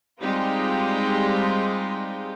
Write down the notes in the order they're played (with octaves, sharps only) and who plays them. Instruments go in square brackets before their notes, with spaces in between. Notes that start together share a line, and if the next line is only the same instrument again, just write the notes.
[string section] G3 G#3 C4 D#4 F4 G4